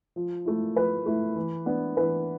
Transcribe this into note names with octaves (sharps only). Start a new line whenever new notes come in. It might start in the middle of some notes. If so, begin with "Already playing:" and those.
F3
A3 E4
F3 B4
A3 E4
E3
B3 D4
E3 B4